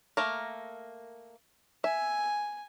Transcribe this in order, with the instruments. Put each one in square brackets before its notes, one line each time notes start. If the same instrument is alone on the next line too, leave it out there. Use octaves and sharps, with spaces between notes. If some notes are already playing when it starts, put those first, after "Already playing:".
[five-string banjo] A3 A#3 A#4
[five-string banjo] E5 [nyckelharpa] G#5